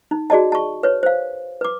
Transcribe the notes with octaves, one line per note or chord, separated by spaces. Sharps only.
D#4
F#4 G#4 D5 D#5 A5
A5 C#6
B4 C#5
C5 F5
B4 D6